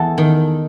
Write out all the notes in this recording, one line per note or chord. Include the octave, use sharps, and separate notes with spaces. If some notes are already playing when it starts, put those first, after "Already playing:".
Already playing: E2 A4
D#3